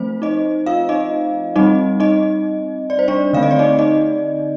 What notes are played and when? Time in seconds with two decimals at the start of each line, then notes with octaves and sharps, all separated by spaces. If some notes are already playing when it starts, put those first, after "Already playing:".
Already playing: F3 A3 C4 C5
0.22 D#4 D#5
0.66 F4 F5
0.89 D#4 D#5
1.56 G3 C4 D#4 D#5
2.00 D#4 D#5
2.90 D5
2.99 C5
3.08 D4 D5
3.33 D3 A3 C4 F5
3.43 D#5
3.51 D5
3.59 D#4 D#5
3.79 D#4 D#5